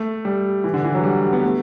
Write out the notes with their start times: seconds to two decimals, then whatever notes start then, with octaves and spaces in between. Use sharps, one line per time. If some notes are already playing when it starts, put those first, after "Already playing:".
Already playing: A3
0.25 G3
0.64 E3
0.74 D3
0.84 E3
0.95 F#3
1.03 G3
1.33 B3
1.43 A3